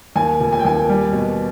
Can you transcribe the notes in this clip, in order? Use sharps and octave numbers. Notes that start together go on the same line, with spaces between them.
D#2 G#5
F1
G#5
G5
D#2 G#5
G3
B2